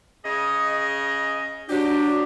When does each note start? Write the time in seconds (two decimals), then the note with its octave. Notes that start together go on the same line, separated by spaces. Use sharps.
0.24 C#3 G#4 D#5
1.70 F#3 D4 F#4 G4